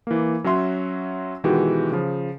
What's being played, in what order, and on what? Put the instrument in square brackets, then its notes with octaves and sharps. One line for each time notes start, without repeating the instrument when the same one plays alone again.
[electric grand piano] E3 A#3
F#3 C#4 F#4 E5 C6
B2 D#3 E3 G#3 F#4 G4
C#3 F3